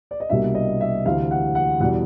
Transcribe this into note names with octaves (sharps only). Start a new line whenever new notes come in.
D5
D#5
C2 B2 G3 A#3 D4 E5
D#5
E5
D2 C3 E3 F5
F#5
F#5
E2 B2 G3 F#5